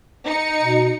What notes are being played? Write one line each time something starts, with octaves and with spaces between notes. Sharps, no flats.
D#4 C#7
B2